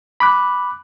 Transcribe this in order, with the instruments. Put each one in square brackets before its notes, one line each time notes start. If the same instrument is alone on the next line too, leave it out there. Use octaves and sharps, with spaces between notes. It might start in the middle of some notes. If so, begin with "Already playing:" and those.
[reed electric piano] B5 D6 F#6